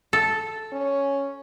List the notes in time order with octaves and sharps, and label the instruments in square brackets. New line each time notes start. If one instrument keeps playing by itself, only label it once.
[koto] A4
[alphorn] C#4